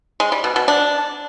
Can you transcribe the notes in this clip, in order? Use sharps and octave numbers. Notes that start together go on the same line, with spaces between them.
G#3
G3
B2
B2
D4